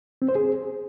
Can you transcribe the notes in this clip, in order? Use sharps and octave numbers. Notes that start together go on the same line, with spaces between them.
C4
C5
G#4